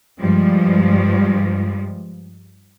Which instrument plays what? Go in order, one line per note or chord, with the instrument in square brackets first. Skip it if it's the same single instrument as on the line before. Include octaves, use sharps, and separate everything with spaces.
[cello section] G2 F3 G3 G#3